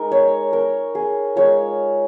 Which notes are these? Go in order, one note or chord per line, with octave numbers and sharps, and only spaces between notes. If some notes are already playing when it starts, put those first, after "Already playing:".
Already playing: G#3 D#4 A#4
C#5
A#4
G#4
G#3 F4 C#5